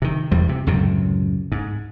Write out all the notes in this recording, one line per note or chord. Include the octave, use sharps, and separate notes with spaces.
C3 D#3
E2 G3
C3
C#2 F#2 A2 C3
G#2